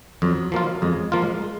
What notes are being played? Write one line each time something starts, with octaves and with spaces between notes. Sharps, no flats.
F2 F#3
F3 A#3 F4
F2 G#3
F3 A#3 F4
G#3
G#3